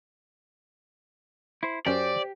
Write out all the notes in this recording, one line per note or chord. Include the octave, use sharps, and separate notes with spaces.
E4 C5
F#2 C#4 G4 C5 D5